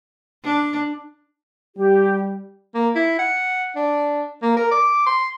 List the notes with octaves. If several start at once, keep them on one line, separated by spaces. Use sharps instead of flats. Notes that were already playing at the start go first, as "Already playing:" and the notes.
D4
G3 G4
A#3
E4
F#5
D4
A#3
A#4
D6
C6